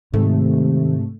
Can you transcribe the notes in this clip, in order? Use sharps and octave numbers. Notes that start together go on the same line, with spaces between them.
G#2 C3 D#3 A3